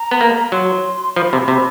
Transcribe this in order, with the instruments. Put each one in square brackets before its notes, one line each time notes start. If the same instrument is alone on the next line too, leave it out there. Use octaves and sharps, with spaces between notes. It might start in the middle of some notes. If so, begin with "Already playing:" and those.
Already playing: [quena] A#5
[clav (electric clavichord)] B3
A#3
[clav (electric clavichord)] F#3 [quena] C6
[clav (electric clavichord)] F3 [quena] B5
[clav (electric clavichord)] C3
C3